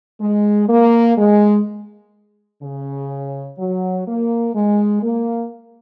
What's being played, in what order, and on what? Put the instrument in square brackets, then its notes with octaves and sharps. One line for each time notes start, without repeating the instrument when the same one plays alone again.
[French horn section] G#3
A#3
G#3
C#3
F#3
A#3
G#3
A#3